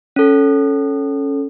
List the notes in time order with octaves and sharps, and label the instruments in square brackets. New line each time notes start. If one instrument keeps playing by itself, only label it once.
[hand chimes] C#4 A4